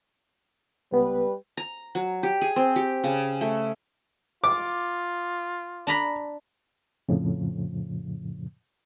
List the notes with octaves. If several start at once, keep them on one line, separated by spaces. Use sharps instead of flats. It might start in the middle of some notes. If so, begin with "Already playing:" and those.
C#2 G3 B3 B4
A#5
F#3
G4
G#4
C4
G4
C#3
A3
F4 D6
D4 A#5 B5
F2 A2 C#3 F3